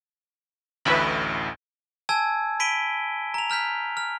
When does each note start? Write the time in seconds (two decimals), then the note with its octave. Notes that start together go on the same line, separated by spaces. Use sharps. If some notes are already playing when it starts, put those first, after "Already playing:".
0.85 A1 D2 A2 B4 E5 B5
2.09 G#5 A5 E6 G#6
2.60 B5 B6 D7 D#7 G7
3.34 A#5 F7
3.50 A#5 F6 G6 B6
3.97 F6